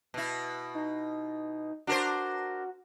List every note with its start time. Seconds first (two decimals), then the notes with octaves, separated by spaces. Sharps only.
0.14 B2 E4
0.75 D#4
1.87 D4 F#4 A#4 C5